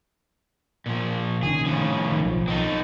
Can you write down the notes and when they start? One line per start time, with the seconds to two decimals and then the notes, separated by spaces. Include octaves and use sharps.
0.86 A#2 F3
1.43 C3 D#3 C#4 G#4
1.65 A2 C#3 F3
2.12 D#3
2.25 B1 F3
2.48 C4 D#4 A4